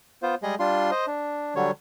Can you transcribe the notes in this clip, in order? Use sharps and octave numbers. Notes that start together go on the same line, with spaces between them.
B3 F4 C5
G3 G#3 G#4 D#5
G3 D4 F4 C6
C5 D#5
D4
D3 F#3 G3 C#5